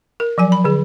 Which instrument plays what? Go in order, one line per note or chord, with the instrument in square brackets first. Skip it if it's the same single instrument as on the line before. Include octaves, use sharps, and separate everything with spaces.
[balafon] A#4
F3 F#3 G#5
B5
D3 G#4